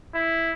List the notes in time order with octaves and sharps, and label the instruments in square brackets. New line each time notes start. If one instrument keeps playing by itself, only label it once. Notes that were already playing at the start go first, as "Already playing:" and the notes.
[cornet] E4